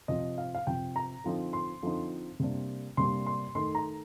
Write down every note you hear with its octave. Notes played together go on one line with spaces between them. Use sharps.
C3 F3 C4 D#5
F5
F5
C3 F3 C4 G5
A#5
D3 F3 C4 D#4
C6
D3 F3 C4 D#4
C3 G3 A#3 D4
C3 G3 A#3 D4 C6
C6
D#3 A3 D#4 C6
A#5